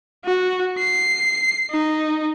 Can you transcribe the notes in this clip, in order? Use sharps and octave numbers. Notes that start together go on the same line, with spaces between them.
F#4
C7
D#4